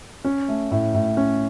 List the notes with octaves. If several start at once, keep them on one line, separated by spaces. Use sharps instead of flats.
C#4
A3
A2
A2
C#4